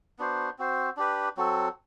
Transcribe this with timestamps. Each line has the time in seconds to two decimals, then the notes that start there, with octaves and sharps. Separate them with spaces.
0.19 B3 D4 F#4 C5
0.59 C4 F#4 C5
0.97 D4 G4 B4
1.37 F#3 C4 F#4 A4